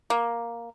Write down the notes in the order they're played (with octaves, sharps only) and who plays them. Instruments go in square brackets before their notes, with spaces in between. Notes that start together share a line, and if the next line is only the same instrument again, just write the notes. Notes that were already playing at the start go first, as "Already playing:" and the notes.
[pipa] A#3